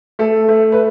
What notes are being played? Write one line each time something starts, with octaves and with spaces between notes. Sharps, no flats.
A3 A4
A3
B4